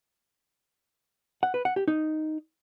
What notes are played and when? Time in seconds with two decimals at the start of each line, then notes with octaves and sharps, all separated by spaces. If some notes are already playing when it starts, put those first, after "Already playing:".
1.43 F#5
1.54 B4
1.65 F#5
1.76 G4
1.88 D#4